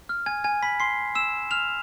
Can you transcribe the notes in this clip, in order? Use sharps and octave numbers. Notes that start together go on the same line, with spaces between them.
F6
G#5 G#6
G#5 G#6
B5 B6
C6 C7
E6 E7
F6 F7